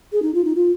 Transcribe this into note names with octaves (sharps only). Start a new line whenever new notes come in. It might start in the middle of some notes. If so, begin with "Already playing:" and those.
G#4
D#4
F4
D#4
F4